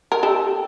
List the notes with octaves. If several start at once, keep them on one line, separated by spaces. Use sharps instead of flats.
A#4
G4 A4